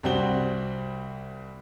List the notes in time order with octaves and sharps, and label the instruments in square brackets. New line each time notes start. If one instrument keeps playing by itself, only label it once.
[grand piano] C2 G3 C4 F#4 G7